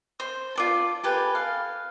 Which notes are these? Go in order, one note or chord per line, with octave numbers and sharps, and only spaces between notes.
C5
F4 D5 A5
G4 A4 B4 G#5
F5